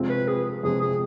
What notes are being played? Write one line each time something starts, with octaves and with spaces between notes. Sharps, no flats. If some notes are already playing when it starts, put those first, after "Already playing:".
Already playing: F2 C3 F3 G#3 C4
B4
G#4
F2 C3 F3 G#3 C4 G#4
G#4